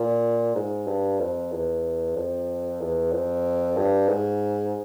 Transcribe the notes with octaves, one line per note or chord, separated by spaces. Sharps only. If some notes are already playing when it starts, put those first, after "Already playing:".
Already playing: A#2
G#2
G2
F2
E2
F2
E2
F2
G2
G#2